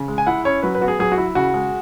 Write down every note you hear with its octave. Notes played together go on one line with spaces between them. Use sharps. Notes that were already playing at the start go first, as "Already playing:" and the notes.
Already playing: C#3
G#3
G#5
E4 F#5
C#4 C#5
F#3 B4
B4
B3 F#4
G#4
F#3 G#4
F#4
E4
C#3 F#4
G#3